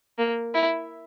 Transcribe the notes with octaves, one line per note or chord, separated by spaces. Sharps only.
A#3
E4